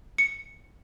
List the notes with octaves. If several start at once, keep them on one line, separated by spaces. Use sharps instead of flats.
C#7